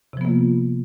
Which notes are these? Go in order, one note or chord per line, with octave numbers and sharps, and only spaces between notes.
C3 F3 A#3 B3 F4